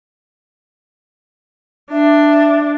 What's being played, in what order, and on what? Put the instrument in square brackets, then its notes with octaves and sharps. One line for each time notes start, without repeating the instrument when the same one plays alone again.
[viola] D4 [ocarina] E5